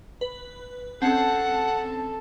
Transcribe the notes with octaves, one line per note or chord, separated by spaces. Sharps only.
B4
C4 C#4 A4 F#5 A5